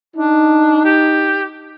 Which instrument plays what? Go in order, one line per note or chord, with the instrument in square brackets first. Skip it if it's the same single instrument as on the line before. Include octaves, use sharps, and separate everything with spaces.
[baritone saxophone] D4 [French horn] D#4
[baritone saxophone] G4